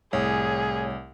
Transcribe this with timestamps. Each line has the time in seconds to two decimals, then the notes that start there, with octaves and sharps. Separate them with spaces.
0.13 C2 A2 G#4 C#5 G#5